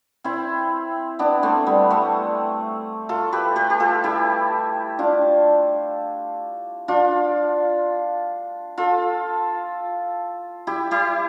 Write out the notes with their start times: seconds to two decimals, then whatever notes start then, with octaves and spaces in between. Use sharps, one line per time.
0.24 C4 E4
1.19 B3 D4
1.43 A3 C4
1.67 G3 B3
1.90 A3 C4
3.09 F4 A4
3.32 G4 B4
3.56 G4 B4
3.70 G4
3.80 F4 A4
4.04 E4 G4
4.99 D4 F4
6.88 D4 F4
8.78 F4 A4
10.67 E4 G4
10.91 E4 G4